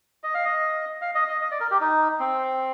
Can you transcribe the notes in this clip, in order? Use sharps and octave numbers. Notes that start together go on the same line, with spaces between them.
D#5
F5
D#5
F5
D#5
D#5
D#5
D5
A#4
G4
D#4
C4